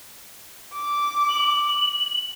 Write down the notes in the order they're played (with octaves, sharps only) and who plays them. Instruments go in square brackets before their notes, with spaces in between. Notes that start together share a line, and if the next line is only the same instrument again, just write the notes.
[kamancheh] D6
[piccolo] F#7